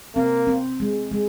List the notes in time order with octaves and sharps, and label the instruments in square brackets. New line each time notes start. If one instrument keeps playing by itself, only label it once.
[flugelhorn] A#3 [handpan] C4
[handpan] C4
G#3
G#3